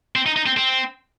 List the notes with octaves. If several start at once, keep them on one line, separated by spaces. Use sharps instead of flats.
C4
D#4
D#4
C4
C4